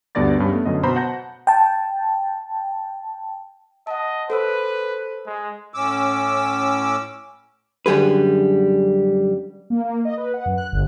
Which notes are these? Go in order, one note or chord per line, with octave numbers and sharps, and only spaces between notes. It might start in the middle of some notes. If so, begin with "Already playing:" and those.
D2 G2 B3 D5 A6 A#6
G2 C#4
A3 B3
F#2 D3 D#5
B2 C5 A#5 B5
F#5 A5 G6 A#6
G5 A5
D#5 F#5 A5
A4 B4 C5 E6
G#3
A2 C#4 D6 E6
F#2 D3 G3 G#4 B4
A#3
A#3
D#5
B4
F#5
F#2
F#6
G1